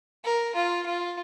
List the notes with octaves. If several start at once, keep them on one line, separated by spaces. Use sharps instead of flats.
A#4
F4
F4